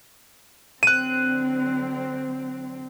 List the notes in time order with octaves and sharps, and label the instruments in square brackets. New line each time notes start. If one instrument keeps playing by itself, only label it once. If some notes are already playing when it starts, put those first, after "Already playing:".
[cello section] D3 F#3 C4 [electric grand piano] F#6 D#7